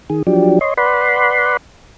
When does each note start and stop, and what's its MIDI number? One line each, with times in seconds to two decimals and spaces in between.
0.10 0.23 51
0.10 0.23 68
0.27 0.59 53
0.27 0.59 54
0.27 0.59 62
0.27 0.59 67
0.61 0.74 73
0.61 0.74 75
0.61 0.74 84
0.77 1.57 71
0.77 1.57 74
0.77 1.57 78
0.77 1.57 83
0.77 1.57 84